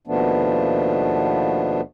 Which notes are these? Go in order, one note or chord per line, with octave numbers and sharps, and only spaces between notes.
D#2 B2 F3 A3 B3 D4